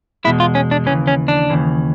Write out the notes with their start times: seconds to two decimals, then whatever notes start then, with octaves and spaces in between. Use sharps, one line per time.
0.25 E2 B2 G#3 E4
0.40 F4
0.55 C#4
0.71 D4
0.86 D#2 C#3 E3 C#4
1.07 C#4
1.28 D4
1.50 D#2 C#3 E3